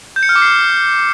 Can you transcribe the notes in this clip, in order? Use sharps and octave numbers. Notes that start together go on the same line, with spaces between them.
G6
C#7
F6
D6
C7